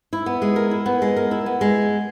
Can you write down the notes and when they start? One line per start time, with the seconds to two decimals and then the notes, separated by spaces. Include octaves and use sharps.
0.13 E4
0.26 B3
0.42 G#3
0.56 A#4
0.71 E4
0.86 B3
1.02 G#3
1.16 A#4
1.31 E4
1.46 B3
1.61 G#3